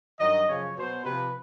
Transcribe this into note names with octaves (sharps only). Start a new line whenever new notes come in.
G2 D#3 F#3 D#5
F#2 C#3 F3 C#5
B2 F#3 C5
C3 F3 B4